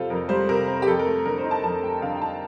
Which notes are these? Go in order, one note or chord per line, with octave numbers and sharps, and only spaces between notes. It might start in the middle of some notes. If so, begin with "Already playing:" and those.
Already playing: F2 C3 G3 C4 F4 A4 F5
F2 A#4
G3 C5
C3 A#4
C4
G4
F2 A4
A#4
A3
D3 A#4
C5
D#4
A5
F2 A5
A3 G5
D3 F5
G5
D#4 A5